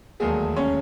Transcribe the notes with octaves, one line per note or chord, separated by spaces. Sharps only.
E1 D#2 D#3 F#3 G#3 A3 G#4
C#4 C#5